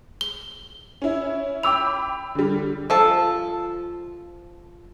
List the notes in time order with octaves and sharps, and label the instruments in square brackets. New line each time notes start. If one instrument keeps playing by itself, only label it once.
[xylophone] G7
[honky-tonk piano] C#4 E4
[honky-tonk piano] G5 B5 [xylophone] D6 E6 F7
[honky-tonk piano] D3 G3
[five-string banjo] F3 A4